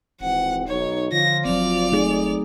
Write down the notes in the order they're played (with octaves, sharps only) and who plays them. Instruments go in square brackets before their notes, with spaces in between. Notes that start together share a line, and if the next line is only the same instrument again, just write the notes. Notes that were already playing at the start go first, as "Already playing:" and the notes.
[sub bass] D#1 [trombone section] G#1 E3 C4 [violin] F#5
[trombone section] B1 D#4 [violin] C#5
[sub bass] D3 [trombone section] F3 F4 [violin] A#6
[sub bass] F1 [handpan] F#3 C4 [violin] D5 F7
[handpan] A3 D#4 G#4